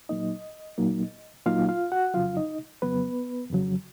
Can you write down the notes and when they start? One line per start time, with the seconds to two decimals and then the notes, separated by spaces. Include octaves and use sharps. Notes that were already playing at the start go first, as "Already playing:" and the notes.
0.09 A#2 F#3 A#3 D#4 D#5
0.78 A#2 F#3 A#3 D#4
1.46 A#2 F#3 A#3 D#4 F4 F5
1.68 F4 F5
1.92 F#4 F#5
2.14 F2 C#3 F#3 F4 F5
2.37 D#4 D#5
2.82 F2 C#3 F#3 B3 B4
3.50 F2 C#3 F#3